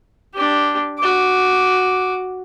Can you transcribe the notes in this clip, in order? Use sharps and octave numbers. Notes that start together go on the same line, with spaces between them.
D4 G4
F#4 D6